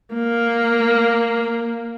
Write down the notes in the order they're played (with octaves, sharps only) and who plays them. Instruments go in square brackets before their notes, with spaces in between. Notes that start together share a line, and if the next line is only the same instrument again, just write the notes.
[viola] A#3